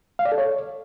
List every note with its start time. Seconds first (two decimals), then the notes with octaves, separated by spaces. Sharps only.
0.19 F5
0.25 D5
0.32 A4
0.38 C#5